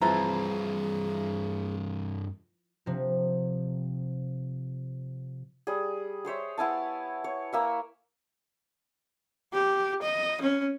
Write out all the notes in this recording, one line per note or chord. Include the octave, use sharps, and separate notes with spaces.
G2 E3 F3 C4 E4 G#4 A#5
C3 F3
G3 G#4
G#4 C5 C#5 E5
B3 E4 G#5 A5
C#5
A#3 E5 G#5
G4
D#5
C#4